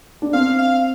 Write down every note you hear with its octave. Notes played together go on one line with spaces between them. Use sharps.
D4
C4 F5
F5